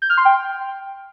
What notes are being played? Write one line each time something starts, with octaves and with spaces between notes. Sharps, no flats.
G6
F6
C6
G5